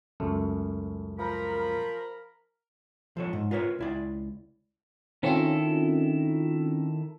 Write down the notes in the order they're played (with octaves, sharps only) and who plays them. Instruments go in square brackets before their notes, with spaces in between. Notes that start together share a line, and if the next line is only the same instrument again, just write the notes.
[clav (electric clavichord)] C#2 F#2 A3
[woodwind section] F3 B5 [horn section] A#4
[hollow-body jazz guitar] F3 A4 C#5
G#2
F4 A#4 B4 C#5
C#2 E4 D5
[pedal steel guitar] D#3 E4 A4 [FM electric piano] C4 C#4 F4